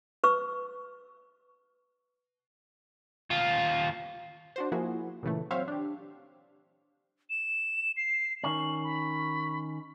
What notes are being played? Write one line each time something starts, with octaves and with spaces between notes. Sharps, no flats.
B4 C#6 E6
D#2 F4
D4 F#4 C5
F3 A#3 E4 F#4 G#4
A#2 C#3 E3 A3
F#3 C4 C5 C#5 E5 F5
D4 G4
E7
C7
D#3 C#4 F#7
B5